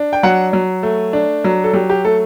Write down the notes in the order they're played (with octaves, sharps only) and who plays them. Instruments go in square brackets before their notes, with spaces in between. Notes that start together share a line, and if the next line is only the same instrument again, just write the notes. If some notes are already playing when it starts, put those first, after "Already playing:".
Already playing: [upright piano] D4
G5
F#3 F#5
F#3
A3
D4
F#3
A4
F#3 G4
G4
A3 A4